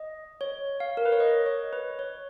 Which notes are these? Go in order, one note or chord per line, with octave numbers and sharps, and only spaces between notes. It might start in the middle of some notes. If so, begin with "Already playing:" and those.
Already playing: D#5
C#5
F5
A#4
B4
C#5
D#5
C#5
B4
C#5